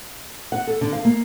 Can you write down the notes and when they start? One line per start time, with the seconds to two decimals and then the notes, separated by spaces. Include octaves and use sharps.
0.52 F#5
0.67 A4
0.81 D3
0.93 F5
1.05 A#3